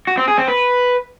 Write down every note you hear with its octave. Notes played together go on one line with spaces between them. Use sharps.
F#4
C4
G#4
C4
B4